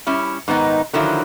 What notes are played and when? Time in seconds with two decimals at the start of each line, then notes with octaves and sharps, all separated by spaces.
0.07 G3 C#4 E4
0.48 G#2 D#3 B3 D#4
0.93 D3 D#3 F3 F#3 E4